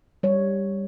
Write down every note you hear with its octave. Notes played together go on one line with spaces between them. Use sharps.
G3 C#5